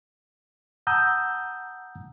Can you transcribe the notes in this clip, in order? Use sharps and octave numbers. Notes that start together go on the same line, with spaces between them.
F#5 A5 A#5 D#6 E6 G6